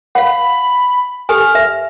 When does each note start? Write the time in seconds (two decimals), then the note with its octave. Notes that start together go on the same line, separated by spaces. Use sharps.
0.15 F5 F#5 B5
1.29 G4 A4 G#5 F6
1.55 E5